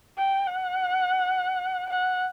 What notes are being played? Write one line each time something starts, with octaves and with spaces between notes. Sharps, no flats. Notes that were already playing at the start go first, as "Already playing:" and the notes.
G5
F#5
F#5